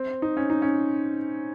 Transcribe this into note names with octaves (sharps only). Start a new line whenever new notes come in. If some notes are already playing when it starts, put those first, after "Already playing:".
Already playing: C4
D#4
C#4
D#4
C#4